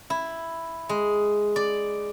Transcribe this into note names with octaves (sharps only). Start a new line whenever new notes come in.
E4
G#3
D5